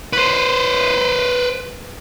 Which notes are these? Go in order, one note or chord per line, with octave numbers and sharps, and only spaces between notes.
B4 C5